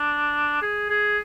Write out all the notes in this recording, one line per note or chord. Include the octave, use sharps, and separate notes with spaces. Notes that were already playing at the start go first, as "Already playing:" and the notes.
Already playing: D4
G#4
G#4